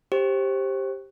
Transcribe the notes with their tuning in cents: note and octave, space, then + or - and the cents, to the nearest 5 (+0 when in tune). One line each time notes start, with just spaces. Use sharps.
G4 +0 C5 +20